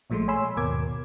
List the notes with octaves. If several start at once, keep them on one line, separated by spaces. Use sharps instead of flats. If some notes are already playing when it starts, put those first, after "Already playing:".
A#1 A#2 F3 G#3 A3 C6
C#5 G#5 B5 C6 E6
G#1 D#2 B2 A#4 D6 G#6